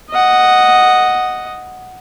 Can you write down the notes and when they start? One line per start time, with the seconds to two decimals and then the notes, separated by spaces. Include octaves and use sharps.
0.11 D#5 F#5